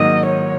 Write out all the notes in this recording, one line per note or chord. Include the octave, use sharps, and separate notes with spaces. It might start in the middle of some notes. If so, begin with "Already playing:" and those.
Already playing: G#2 D#3 F#3 A#3 D#5
C#5